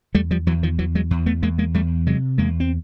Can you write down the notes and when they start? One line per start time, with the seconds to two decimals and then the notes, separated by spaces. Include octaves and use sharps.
0.14 E2 G3 A3
0.31 F3 G3
0.47 E2 E3 F#3
0.63 D#3 F3
0.79 E2 E3 F#3
0.95 F#3 G#3
1.11 E2
1.26 A3 B3
1.43 E2 G#3 A#3
1.58 G#3 A#3
1.74 E2 G3 A3
2.06 C3 F#3 G#3
2.38 E2 G#3 A#3
2.60 C4